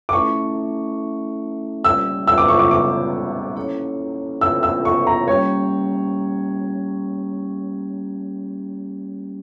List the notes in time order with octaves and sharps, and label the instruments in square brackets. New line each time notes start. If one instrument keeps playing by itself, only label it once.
[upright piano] D6
[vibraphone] A3 C#4 E4 A4 E5 [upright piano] C#6
[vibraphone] G3 A#3 C#4 G4 D5 [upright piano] E6
[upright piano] E6
D6
C#6
D6
D6
[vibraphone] A#3 C#4 E4 A4 C#5
[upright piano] E6
E6
C#6
A#5
[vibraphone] G3 A#3 C#4 G4 [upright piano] C#5